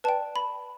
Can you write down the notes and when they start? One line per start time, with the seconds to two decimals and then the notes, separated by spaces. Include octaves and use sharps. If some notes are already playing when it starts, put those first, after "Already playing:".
0.04 B4 D5 G5 A5
0.36 B5